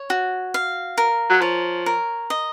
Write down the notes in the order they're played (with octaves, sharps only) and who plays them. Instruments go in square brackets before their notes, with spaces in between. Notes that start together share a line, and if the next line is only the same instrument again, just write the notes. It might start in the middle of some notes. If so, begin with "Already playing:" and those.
Already playing: [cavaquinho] C#5
F#4
F5
A#4
[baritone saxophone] F#3
[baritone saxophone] F3 [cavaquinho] C#5
[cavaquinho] A#4
D#5